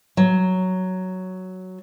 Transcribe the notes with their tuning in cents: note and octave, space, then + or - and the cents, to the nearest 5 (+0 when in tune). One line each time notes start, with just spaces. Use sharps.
F#3 +5